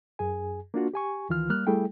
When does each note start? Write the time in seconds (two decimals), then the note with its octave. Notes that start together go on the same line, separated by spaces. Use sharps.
0.19 F#2 G#4 G#5
0.74 A#3 D4 F4 F#4
0.94 G4 G#5 C#6
1.29 D2 D#3 E3 F4 F6
1.49 G3 A#3 F6 F#6
1.67 G3 A3 E4 G#4 A4 G5